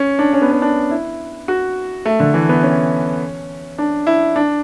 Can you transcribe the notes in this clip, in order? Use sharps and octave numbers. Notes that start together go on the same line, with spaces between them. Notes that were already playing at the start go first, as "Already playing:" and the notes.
Already playing: C#4
D4
C#4
B3
C#4
D4
E4
F#4
A3
D3
E3
B3
C#4
D4
E4
D4